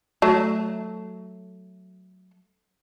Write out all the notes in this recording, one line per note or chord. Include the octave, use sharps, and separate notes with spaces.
F#3 A3